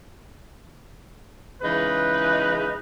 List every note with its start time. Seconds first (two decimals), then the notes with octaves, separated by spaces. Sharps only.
1.62 C#3 E3 G#3 D#4 B4